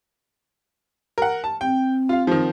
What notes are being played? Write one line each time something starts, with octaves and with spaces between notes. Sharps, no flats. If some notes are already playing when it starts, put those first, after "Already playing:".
A#4 F#5
A5
C4 G5
F4 F5
D#3 F3